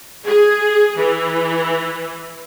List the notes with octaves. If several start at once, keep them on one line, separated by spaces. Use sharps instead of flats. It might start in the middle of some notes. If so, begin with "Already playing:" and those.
G#4
E3